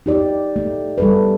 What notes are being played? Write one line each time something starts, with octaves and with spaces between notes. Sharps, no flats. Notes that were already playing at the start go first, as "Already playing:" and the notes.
D#4 G4 D5
A3
G3 A4 B4